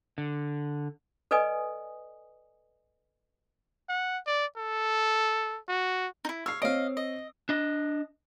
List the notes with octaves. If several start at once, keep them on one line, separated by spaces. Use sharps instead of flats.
D3
A4 B4 D5 D#5 G#5 D#6
F#5
D5
A4
F#4
D#4 E4
C#5 F5 E6 C7
C4 C#5 D#5 F5 D7
D#5
D4 D#5